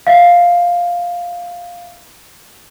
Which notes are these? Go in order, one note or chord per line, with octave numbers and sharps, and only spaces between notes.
E5 F5